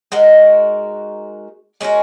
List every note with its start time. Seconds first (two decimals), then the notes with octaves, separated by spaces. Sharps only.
0.12 G#3 D#4 F#4 A#4
1.81 G#3 C#4 F#4 A#4